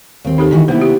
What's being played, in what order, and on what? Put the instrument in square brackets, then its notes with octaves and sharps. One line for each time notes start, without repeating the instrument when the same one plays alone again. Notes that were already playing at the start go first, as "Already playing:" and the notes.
[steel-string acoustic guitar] D#2 C4
[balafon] D#4 G4 A4
[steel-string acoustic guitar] D#3 E3 F#4 [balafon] D4
[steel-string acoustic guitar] C3 B3 E4 [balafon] A#3 C5
[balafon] G4